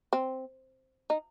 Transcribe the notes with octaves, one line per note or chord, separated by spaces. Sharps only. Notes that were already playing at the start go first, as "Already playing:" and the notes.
C4
D#4